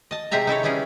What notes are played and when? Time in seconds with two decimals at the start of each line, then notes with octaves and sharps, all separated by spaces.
0.11 D#5 A5
0.31 C3 G#3 G4 G#4 E5 A#5
0.47 D#4 E4 A4 C#5
0.63 G3 B3 C#4 E4 G#4